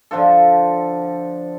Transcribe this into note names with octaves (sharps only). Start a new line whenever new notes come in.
D3 F3 F4 A4